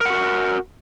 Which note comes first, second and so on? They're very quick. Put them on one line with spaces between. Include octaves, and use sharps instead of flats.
A#4 F#5 F#4